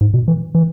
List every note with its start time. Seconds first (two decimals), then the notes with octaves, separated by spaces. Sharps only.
0.01 G#2
0.14 B2
0.28 E3
0.55 E3